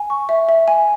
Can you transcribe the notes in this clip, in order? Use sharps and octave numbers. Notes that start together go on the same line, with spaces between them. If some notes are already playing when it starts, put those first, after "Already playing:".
Already playing: G#5
C#6
E5
E5
G#5